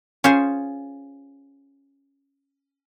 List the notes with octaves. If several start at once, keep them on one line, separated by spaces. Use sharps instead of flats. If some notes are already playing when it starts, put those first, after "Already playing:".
C#4 F4 G#4 C5